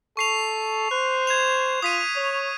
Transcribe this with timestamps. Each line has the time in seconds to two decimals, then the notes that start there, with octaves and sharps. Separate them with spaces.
0.17 A4 C#6 C7 F7
0.91 C5 F#6
1.27 G#6 E7 F7
1.82 F4 D#6 B6 D#7
2.16 C#5